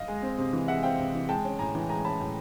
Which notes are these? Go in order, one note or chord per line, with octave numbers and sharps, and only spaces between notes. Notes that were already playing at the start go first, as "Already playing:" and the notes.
Already playing: D#5 F5
G#3
C4
C3
E3
G#3 E5 F#5
C4 F5 G5
C3
E3
G#3 G5 A5
C#4
A2 G#5 A#5
E3
G#3 G#5 A#5
C#4 A5 B5
A2